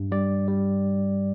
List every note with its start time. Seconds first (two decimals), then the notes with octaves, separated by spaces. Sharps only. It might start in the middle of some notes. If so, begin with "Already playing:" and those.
Already playing: G2
0.12 G3 D5
0.48 G3